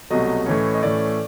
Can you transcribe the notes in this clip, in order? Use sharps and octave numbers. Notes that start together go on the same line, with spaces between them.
C2 B2 F#3 A3 D#5
A2 E3 A3 C#4
D#5
A2 E3 A3 C#4 D5